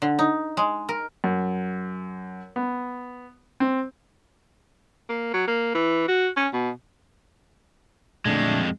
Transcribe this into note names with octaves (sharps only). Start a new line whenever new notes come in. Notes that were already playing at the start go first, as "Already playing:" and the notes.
D3
D#4
G#3
A#4
F#2
B3
C4
A#3
F#3
A#3
E3
F#4
C#4
B2
F2 A#2 D3 F#3 G#3 A3 D4